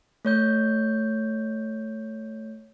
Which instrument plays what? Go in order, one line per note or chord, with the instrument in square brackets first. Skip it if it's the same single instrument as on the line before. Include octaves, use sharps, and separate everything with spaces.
[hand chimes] A3 C#5 G6